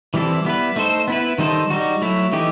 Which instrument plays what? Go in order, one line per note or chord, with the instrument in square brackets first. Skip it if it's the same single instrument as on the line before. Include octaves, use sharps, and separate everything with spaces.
[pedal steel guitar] E3 G3 C4 E4 A4
G3 B3 E4 B4
A3 D#4 A4 C5
B3 E4 B4
D#3 G3 D#4 A4 C5
G3 D#4 F#4
F#3 A3 E4
E3 A3 D#4 G4